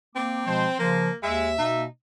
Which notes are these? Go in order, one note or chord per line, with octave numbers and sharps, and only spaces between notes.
A#3 C4 D6
B2 F3 G#3 C5
C#3 F3 A#3
D#2 G#3 E5
B2 A#3 D#4